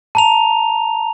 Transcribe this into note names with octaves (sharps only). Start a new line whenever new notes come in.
A5 A#5 F7